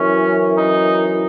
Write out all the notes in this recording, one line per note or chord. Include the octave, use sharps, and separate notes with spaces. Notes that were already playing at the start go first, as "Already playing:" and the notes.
Already playing: F#2 E3 C#4
D#4